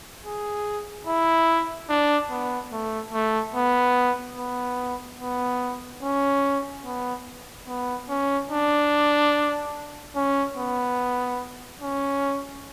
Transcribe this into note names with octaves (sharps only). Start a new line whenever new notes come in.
G#4
E4
D4
B3
A3
A3
B3
B3
B3
C#4
B3
B3
C#4
D4
C#4
B3
C#4